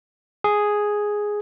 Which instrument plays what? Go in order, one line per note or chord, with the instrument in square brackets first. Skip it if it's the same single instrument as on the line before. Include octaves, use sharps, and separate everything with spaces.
[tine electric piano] G#4